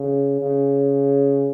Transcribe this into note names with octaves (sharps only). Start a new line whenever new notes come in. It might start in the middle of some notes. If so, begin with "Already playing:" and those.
Already playing: C#3
C#3